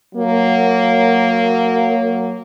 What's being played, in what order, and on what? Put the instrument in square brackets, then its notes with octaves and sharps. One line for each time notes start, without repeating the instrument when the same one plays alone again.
[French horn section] F#3 A#3